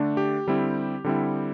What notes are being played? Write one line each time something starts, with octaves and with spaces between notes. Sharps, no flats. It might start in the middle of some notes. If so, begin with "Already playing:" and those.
Already playing: D3 A3 D4
G4
D3 G3 C4 E4
D3 G3 C4 E4